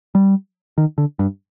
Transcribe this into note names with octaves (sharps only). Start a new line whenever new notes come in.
G3
D#3
D3
G2